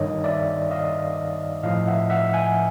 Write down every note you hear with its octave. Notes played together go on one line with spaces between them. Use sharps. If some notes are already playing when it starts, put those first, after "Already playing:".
Already playing: G2 D#3 C#5 D#5
D5 E5
D#5 F5
A2 F3 D#5 F5
E5 F#5
E5 F#5
F#5 G#5